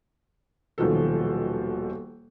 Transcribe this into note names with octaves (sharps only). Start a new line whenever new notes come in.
D#1 B2 D#3 F3 F#3 A4